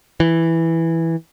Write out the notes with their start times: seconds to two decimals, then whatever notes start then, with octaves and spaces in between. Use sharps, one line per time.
0.20 E3